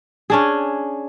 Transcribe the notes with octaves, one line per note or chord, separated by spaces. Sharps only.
C#4 D4 G#4